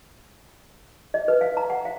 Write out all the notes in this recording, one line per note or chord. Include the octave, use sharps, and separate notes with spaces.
D#5
B4
F5
A#5
F#5
F5